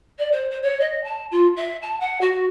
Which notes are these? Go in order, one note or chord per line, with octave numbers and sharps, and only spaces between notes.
D5
C5
C5
C#5
D#5
A5
F4
E5
A5
F#5
F#4